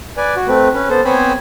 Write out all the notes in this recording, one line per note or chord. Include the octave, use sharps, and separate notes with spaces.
B4 D5 G#5
F#4
A3 C4 B4
C#4 B4
B3 A4 C5
B3 C4 C5 C#5 G#5 B5